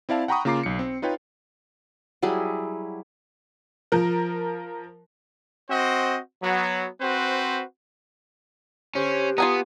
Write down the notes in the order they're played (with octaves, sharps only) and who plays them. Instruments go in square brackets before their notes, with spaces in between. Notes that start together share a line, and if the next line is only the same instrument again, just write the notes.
[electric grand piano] C4 E4 D5 F5 A5
F#5 G5 A#5 B5 C#6 D#6
C#3 A#3 F4 A#5 D6 C7
B1 C#7
C4
D#4 F4 B4 C#5 G5
[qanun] F#3 G3 E4 G#4
[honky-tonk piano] F3 A#4
[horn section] C4 F#4 C5 D#5
F#3 B3
C4 F#4 B4 C5
[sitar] D3 G4 [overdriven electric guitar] C#4 [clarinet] C5
[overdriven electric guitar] B3 [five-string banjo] F4 G#5 A#5 [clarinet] D#6